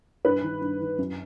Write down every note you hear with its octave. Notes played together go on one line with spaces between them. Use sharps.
G2 B4
D#3
G2
D#3
F#2